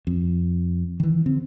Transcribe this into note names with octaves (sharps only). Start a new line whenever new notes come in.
F2
D#3 E3
D3 C4